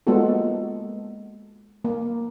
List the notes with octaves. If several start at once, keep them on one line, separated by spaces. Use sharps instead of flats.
G#3 A#3 B3 F4 F#4 A4
A#3